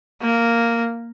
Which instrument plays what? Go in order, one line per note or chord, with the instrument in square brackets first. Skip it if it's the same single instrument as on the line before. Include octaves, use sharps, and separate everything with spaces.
[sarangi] A#3